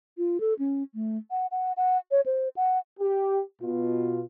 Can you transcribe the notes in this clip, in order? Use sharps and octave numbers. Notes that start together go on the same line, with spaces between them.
F4
A4
C#4
A3
F#5
F#5
F#5
C#5
C5
F#5
G4
B2 F4